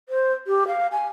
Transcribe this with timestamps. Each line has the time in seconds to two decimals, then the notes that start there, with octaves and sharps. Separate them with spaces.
0.09 C5
0.47 G4
0.68 F5
0.92 G#5